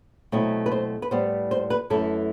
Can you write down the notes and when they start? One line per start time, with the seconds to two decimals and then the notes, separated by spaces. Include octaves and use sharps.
0.32 B2 F#3 A3 C4 E4
0.66 B4
0.72 C5
1.02 B4
1.11 A2 G3 B3 C5
1.51 C5
1.70 B4
1.90 F#2 E3 A3 E4 A4